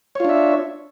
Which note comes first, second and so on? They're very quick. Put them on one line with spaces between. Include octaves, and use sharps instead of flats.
C#5 F4 D4 E5